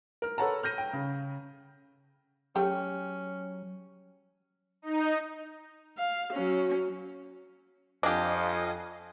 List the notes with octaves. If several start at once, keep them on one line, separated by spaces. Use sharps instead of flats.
A#4 F6
A4 B4 C#5 F#5 A5 A#5
F6 G6 A#6 D#7
G5
C#3
F#3 A3 C#4 G4 G5
D#4
F5
F#3 C#4
F2 D4 G4 D#5 F5 G#5